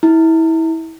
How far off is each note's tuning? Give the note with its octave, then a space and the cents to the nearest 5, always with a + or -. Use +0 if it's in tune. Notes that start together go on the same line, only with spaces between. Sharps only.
E4 -25